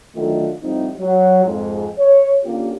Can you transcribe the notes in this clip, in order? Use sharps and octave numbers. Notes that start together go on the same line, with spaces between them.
D3 D#3 F#3 A3 D#4 F4
A2 F3 G3 C4 D#4
F#3
F2 G#2
C#5
D3 A#3 C#4 F4 G4